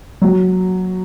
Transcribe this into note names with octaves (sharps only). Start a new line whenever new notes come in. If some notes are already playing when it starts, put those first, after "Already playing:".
F#3